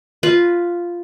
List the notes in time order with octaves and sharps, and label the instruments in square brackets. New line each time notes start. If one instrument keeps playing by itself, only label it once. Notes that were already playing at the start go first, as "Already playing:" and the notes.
[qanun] F4 B4